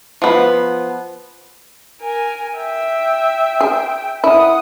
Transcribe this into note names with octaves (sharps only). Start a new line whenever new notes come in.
F3 B3
A#4 G#5
E5 G5
G#4
E4 F#5 D#6